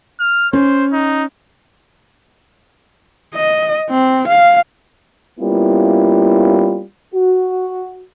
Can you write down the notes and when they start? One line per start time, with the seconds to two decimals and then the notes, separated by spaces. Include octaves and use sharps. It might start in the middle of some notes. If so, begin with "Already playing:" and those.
0.20 F6
0.53 C#4 C5
0.93 D#4
3.35 D#5
3.90 C4
4.28 F5
5.40 G3 A#3 B3 C#4 E4 F4
7.15 F#4